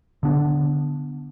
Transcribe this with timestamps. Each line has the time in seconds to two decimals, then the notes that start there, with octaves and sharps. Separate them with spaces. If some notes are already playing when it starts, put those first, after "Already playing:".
0.23 D3 B3 D4